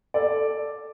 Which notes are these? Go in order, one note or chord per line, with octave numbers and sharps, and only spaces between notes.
A4 D5